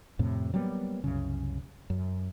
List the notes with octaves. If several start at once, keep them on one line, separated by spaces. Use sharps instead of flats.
F2 A2 C3
F#3 G3 A#3 B3
C2 F#2 C#3
F#2